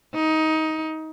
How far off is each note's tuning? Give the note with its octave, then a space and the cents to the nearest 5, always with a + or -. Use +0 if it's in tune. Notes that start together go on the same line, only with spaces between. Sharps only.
D#4 +20